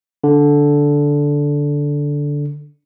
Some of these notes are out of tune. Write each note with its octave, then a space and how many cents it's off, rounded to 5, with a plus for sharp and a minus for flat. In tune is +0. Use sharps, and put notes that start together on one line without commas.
D3 -10